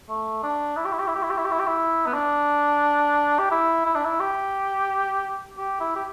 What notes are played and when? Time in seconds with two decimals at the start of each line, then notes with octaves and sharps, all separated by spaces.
0.09 A3
0.43 D4
0.77 E4
0.85 G4
0.92 E4
0.99 G4
1.07 E4
1.15 G4
1.23 E4
1.30 G4
1.38 E4
1.45 G4
1.52 E4
1.59 G4
1.67 E4
2.06 B3
2.14 D4
3.39 G4
3.51 E4
3.86 E4
3.95 D4
4.05 E4
4.20 G4
5.58 G4
5.80 E4
5.96 G4